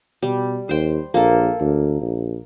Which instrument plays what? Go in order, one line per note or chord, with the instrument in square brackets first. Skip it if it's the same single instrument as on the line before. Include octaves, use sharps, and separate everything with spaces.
[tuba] B2 [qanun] G3
[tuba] D#2 [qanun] C5 G5
[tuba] A#1 [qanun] A#3 A4
[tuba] D2
A#1